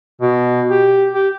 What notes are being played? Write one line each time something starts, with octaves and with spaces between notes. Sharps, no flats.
B2
G4
G4